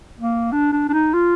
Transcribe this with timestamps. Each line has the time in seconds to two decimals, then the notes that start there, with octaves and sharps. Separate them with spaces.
0.20 A#3
0.52 D4
0.72 D4
0.89 D4
0.93 D#4
1.13 F4